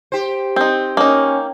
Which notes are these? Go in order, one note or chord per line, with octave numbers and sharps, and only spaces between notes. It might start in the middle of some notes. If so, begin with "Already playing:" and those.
G4 C5
C4 D#4 G5
A#3 C#4 D#4